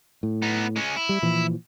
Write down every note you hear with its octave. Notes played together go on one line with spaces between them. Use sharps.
A2
B3 D#4
G#3 C#4
E4
G3
A#2 E3 F3